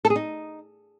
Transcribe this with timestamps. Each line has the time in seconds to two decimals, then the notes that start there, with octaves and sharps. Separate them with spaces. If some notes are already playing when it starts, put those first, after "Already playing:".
0.05 A4
0.10 G#4
0.16 D#4